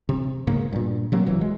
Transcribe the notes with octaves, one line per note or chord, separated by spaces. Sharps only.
C3
G#2 C#3 A#3
G2 A#2
C3 F#3 A#3
D1 E3 F#3
G#3